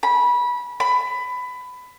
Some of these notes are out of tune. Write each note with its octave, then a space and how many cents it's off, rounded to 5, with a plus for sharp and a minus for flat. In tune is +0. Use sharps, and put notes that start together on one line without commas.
B5 -20
B5 +20